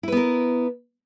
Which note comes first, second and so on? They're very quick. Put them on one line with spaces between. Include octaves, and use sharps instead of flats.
E4 B4 B3 A#4